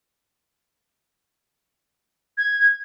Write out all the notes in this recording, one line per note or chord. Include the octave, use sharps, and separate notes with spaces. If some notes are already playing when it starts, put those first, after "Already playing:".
G#6